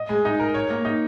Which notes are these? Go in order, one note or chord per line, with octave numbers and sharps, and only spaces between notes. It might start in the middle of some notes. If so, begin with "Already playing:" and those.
Already playing: D#5
G#3
D#4
A#4
C#5
A#3
D#4